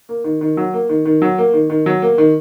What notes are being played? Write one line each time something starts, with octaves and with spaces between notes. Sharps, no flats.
A#3
D#3
D#3
F#3
A#3
D#3
D#3
F#3
A#3
D#3
D#3
F#3
A#3
D#3